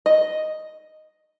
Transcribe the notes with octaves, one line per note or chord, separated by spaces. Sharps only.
D#5